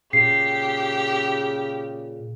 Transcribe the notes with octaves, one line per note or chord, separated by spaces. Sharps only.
A#2 C#3 G4 C7